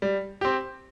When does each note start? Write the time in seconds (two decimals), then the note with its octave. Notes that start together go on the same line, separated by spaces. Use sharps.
0.02 G3
0.41 C4 G4